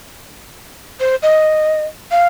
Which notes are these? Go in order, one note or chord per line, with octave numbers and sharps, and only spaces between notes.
C5
D#5
F5